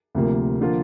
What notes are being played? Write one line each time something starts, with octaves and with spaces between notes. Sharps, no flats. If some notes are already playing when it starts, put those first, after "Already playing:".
D2 C3 F3 A#3
D3 F3 A#3 F4